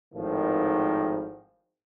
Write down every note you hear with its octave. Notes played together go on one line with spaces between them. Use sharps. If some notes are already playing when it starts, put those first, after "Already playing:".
G#1 A2 D#3 F3